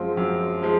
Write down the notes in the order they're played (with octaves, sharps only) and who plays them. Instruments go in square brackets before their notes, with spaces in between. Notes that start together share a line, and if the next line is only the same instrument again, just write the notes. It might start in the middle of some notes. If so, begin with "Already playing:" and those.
Already playing: [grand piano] F#2 F3 G#3 C4 F4
F#2
F3 G#3